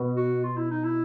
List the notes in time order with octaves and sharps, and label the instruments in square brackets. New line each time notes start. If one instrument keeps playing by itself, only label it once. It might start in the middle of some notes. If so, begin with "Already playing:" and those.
Already playing: [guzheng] B2
[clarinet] F#4
F4
E4
D#4
E4